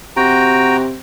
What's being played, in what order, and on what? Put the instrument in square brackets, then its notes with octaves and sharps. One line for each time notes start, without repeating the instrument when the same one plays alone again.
[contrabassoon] C3 [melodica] F#4 G5 A#5